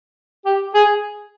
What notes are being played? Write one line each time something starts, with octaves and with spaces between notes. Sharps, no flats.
G4
G#4